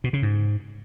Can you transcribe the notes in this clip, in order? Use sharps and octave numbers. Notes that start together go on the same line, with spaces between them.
B2
C#3
G#2